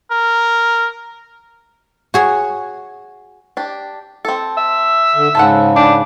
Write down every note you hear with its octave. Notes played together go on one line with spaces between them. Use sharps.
A#4
F#4 G#4 C#5
D4 G4
C4 A4
E5
D3
G#2 C#3 A4 C5 F#5
B3 D4 G4